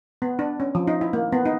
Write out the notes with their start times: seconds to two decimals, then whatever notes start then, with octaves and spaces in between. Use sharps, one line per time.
0.22 B3
0.39 D4
0.60 C#4
0.75 F3
0.88 D#4
1.01 E4
1.13 A#3
1.32 B3
1.46 D#4